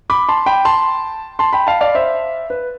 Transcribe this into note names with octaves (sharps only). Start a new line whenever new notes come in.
B5 D6
A5 C6
G5 B5
A5 C6
A5 C6
G5 B5
F5 A5
D5 F5
C5 E5
B4